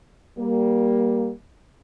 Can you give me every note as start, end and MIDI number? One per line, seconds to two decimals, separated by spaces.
0.38 1.31 55
0.38 1.31 58